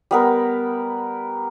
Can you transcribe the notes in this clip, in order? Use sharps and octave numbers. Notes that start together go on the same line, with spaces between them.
G3 B3 A#4